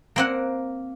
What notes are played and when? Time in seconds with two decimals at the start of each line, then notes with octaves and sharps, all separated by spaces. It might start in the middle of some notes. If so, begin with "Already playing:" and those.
0.16 A#3 C4 F#5